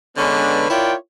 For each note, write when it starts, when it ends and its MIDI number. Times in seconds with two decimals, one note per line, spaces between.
0.17 0.66 50
0.17 0.66 56
0.17 0.66 59
0.17 0.66 61
0.17 0.66 62
0.17 0.66 71
0.69 0.93 64
0.69 0.93 65
0.69 0.93 70
0.69 0.93 73
0.69 0.93 74
0.69 0.93 79